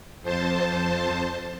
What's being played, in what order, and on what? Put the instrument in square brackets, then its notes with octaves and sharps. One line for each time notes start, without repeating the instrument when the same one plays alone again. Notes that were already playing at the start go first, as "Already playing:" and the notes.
[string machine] F2 C5 A5